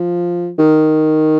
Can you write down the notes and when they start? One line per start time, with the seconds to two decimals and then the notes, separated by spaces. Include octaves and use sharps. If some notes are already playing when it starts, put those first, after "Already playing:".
Already playing: F3
0.59 D#3